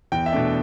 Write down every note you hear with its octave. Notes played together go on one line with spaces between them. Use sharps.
E2 G5
E5
B2 A3 D4